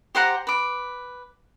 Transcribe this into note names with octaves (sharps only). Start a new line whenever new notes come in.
G4 C5 F#5 A#5
B4 D6